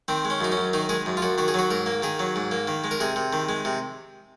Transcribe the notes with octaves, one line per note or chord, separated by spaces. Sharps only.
D#3 C4
G#3
C#4
F#2 D#4
C#4
F#2
D#3 D#4
G#3 G#4
F#2
F4
F#2 F#4
D#3 F#4
G#4
F#3 F#4
G#2 A#4
A#3
D#3 G#4
F#3
G#2
A#3
D#3
G#3
A#4
C3 G#4
C3
D#3
G#3
C3